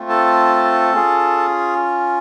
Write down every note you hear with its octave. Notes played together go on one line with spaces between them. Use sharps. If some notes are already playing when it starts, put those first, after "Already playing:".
Already playing: A3 C4 F4
A4 A5
C#4 F4 G#4